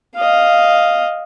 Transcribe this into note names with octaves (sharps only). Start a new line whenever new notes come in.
D#5 F5